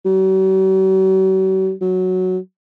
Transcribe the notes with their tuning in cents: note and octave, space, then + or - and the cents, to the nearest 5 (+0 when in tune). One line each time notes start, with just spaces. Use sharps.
F#3 +45
F#3 +0